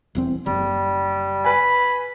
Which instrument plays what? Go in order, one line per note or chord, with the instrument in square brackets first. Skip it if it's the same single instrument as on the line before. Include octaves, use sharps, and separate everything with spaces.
[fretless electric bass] D#1 E2 C4
[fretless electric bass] F#1 [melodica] G3
[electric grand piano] B4 G#5 [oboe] B5